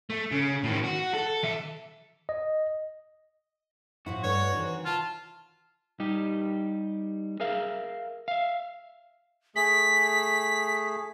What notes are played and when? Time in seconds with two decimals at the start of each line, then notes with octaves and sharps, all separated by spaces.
0.10 A3
0.32 C#3
0.64 A2 D#3
0.84 F#4
1.14 A4
1.43 D#3 E5
2.29 D#5
4.06 A2 F3 E4 F#4
4.24 G2 A3 D4 C#5
4.52 C3 D#3 E3
4.85 F4 A5
6.00 G3 D#4 G4
7.40 G#4 A#4 E5 F5
8.28 E5 F5
9.56 A3 G#4 B6